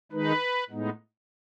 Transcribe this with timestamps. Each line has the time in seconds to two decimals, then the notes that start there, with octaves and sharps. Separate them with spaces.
0.12 D#3 G#3 D#4 B4
0.70 A2 G#3 B3 D#4